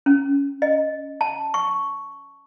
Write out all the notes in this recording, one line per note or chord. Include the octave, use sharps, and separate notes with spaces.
C#4
D#5
A5
C#6